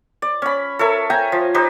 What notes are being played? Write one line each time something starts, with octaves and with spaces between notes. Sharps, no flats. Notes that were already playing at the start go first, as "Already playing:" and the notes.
D5
C#4 B5
A4 A#4 C#5 E5
E5 G5 G#5 A#5
F3
D#4 G4 B4 C5